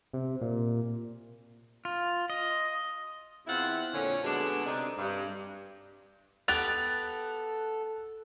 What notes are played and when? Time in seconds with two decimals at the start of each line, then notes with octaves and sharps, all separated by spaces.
0.13 C3
0.41 A#2
1.85 F4
2.30 D#5
3.47 E2 C4 E4 F4 E5 F#5
3.94 F2 A#2 D3 C#4
4.24 B2 D3 G#3 A3 D4
4.66 C3 D4 D#4
4.98 G2
6.48 B3 G4 A4 F#6 A6 F7